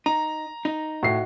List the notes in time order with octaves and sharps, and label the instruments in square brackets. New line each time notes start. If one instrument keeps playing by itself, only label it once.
[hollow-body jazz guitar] D#4 [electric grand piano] A#5
[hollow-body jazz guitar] D#4
[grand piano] A2 [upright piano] F#4 C7